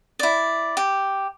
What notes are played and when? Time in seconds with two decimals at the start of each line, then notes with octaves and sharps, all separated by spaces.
0.19 E4 D5
0.77 G4